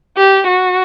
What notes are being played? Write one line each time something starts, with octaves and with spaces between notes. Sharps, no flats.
G4
F#4